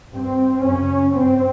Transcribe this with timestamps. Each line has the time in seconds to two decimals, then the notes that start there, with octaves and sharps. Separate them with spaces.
0.12 G2 C4
0.64 F#2 C#3 C#4
1.15 G2 C4